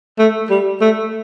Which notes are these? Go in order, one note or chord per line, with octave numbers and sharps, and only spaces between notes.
A3
G3
A3